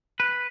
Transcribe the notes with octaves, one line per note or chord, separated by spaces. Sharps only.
B4